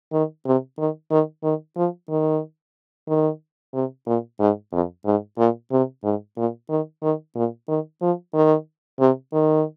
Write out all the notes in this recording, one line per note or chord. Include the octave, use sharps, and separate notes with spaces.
D#3
C3
D#3
D#3
D#3
F3
D#3
D#3
C3
A#2
G#2
F2
G#2
A#2
C3
G#2
A#2
D#3
D#3
A#2
D#3
F3
D#3
C3
D#3